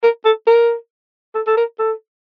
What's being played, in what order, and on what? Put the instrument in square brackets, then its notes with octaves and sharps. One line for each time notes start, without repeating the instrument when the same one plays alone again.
[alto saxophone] A#4
A4
A#4
A4
A4
A#4
A4